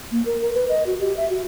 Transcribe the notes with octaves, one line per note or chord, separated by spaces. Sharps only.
A#3
A#4
A#4
B4
D#5
F#4
G4
E5
F#4